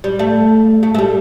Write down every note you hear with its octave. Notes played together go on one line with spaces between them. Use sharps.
G3
A3
A3
A3
G3